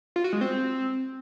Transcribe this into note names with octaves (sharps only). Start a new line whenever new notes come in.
F4
F#4
G#3
C4